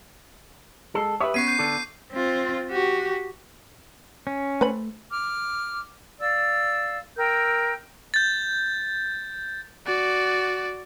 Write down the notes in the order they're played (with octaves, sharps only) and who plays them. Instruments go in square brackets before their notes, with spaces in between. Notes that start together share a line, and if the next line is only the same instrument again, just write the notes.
[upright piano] G#3 C7 [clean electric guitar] A4
[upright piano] G4 E5 D#6 [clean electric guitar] B4 C#5
[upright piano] B3 [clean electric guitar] C#4 [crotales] C#6 C7 D#7
[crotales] C#6 G6 C7
[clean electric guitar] D3 D4 A4
[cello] C4 F4
F#4 G4
[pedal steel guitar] C#4
[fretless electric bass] A3 [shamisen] B4 C5 B5
[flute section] D6 F6
D5 F5 E6
A#4 G5 E6 G6
[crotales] G6 A6
[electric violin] F#4 D5